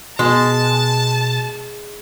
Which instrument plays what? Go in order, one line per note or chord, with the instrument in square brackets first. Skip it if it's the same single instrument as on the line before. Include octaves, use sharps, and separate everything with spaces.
[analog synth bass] B2 [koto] G#3 [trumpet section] A5